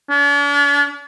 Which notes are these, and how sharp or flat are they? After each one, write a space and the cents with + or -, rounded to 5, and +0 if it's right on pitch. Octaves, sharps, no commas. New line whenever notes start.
D4 -45